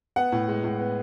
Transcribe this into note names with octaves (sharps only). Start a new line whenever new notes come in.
B3 F#5
A2
G#3
A2
B3